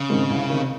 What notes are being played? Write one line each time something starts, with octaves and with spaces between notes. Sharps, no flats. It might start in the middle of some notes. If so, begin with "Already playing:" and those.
Already playing: C#3
G#2 D#3 G#3 C4
C2
C3 D#3